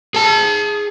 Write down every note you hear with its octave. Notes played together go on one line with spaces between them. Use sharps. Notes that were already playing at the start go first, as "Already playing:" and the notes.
G#4 A5